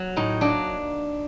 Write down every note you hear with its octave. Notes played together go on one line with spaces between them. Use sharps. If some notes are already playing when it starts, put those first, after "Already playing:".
Already playing: F#3
A2 D#4
F#3 A#3 D4